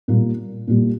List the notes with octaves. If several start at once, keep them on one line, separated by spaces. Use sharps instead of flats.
A#2 G3 A#3
A#2 G3 A#3